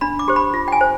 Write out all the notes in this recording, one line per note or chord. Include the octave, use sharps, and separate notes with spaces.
D4 B5
D6
G4 C5
B5
F4
G5
G#5
C5